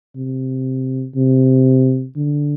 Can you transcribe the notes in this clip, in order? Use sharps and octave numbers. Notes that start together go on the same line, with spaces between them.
C3
C3
D3